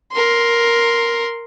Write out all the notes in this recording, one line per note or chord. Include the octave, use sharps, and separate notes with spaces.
A#4 C6